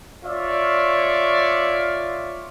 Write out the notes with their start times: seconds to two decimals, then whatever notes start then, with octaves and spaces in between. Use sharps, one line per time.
0.24 F4 C#5 D5 E5